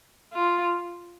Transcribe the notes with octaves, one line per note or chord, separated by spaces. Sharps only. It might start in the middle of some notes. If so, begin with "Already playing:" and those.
F4